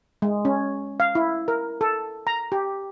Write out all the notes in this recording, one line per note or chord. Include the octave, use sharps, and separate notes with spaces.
G#3
C#4
F5
E4
A#4
A4
A#5
G4